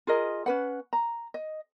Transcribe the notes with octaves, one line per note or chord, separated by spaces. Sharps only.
F4 G#4 A#4 D#5
C#4 B4 F#5
A#5
D#5